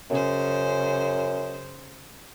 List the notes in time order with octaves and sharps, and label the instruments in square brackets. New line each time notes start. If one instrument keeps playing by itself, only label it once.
[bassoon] F#2 [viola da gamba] C#3 C5